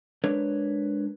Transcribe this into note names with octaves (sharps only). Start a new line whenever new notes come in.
G#3 D4 A#4 B4 C#5